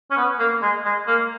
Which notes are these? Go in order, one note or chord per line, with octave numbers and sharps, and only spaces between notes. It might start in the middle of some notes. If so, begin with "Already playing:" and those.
C#4
B3
A#3
G#3
G#3
A#3